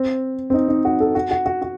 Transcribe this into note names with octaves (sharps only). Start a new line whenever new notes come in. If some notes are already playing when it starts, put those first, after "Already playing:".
Already playing: C4
C4
D#4
D#4
F#4
A4
F#4
F#4
F#4
F#4